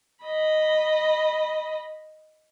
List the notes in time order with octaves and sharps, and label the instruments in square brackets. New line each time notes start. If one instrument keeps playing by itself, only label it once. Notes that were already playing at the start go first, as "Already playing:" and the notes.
[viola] D#5 B5